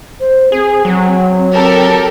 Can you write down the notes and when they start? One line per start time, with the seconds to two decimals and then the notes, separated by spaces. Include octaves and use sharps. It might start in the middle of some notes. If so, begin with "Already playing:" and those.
0.20 C5
0.52 C4 G#4
0.85 F#3
1.53 G4 A4 A#4